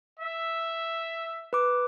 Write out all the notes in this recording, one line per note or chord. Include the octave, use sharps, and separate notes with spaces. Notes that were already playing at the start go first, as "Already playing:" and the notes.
E5
B4 D6